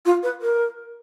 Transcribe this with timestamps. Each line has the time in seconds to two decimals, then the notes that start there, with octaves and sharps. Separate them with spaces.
0.06 F4
0.23 B4
0.42 A#4